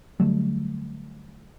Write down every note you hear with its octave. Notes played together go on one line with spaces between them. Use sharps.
D3 F#3 G3 A3